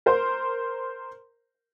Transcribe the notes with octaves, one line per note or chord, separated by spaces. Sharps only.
A#4 C5